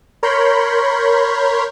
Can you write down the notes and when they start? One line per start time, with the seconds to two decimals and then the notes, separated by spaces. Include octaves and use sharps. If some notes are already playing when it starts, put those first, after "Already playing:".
0.23 A#4 C#5 B5 C6 G6